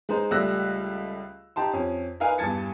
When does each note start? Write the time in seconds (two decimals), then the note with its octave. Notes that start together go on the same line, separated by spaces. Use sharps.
0.09 G#3 D#4 C5
0.31 C#2 G3 A3 E6 F#6 A#6
1.56 D#4 G4 A5 C6
1.73 F2 C#4
2.20 D#4 A#4 B4 F5 G#5
2.38 E2 G2 A5 G#6 A6 C#7